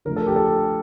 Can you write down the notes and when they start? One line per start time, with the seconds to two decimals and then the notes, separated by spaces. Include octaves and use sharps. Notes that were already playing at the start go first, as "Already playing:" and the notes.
0.05 D3 F3 A3 A#4
0.16 A4
0.27 G4
0.36 A4